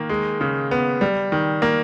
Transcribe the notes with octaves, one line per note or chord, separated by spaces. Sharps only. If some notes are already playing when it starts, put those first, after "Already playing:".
Already playing: D#3 A#3
G#3
C#3
B3
G3
D#3
A#3